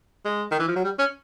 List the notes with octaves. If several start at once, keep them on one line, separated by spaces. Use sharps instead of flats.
G#3
D#3
E3
F3
F#3
G3
C#4